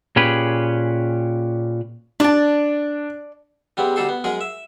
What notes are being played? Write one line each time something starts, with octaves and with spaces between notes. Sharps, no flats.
A#2 C#4 G4 G#4 B4
D4 D5 A5
C#3 G3 B3 C4
D2 G3 D#4 A4 C6
B3
F#2 G#3 G#4 A#4
E5